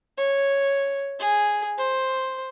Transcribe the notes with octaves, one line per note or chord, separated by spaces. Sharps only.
C#5
G#4
C5